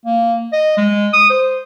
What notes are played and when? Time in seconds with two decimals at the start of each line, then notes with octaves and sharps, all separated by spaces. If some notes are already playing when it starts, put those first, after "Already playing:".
0.06 A#3
0.53 D#5
0.77 G#3
1.13 D#6
1.30 C5